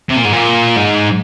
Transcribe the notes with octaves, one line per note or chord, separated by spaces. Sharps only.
C3
A#2
G#2
A#2
G#2